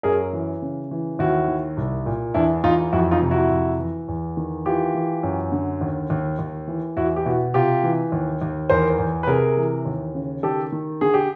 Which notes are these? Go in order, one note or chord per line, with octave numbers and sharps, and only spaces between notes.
F#2 G#4 A#4
E3
C#3
E3
D#2 E4 F#4
D#3
C2
A#2
E2 D4 E4
E2 D#4 F4
F2 E4 F#4
D#4 F4
C3
E4 F#4
F2
E3
E2
D#3
E3 F4 G4
E3
F#2
D3
D#2
D#2
D#2
E3
E2 E4 F#4
G4
B2 E4 F#4
C3 F4 G4
E3
D#2
D#2
E2 A#4 C5
E2
B4
C3 G#4 A#4
E3
D#2
C#3
D#3 G4 A4
D#3
D3 G#4
G4